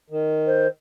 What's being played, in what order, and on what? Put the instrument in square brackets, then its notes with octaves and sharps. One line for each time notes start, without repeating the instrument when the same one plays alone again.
[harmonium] D#3
[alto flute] C5